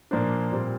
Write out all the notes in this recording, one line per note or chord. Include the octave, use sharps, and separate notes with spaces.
A#2 F3 A#3 D4 C5
A#2 G3 C4